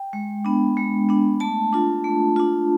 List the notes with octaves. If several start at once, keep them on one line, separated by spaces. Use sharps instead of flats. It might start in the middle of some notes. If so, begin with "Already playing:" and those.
Already playing: G5
G#3
B3 D4
G#3
B3 D4
A3 A5
D4 F4
A3
D4 F4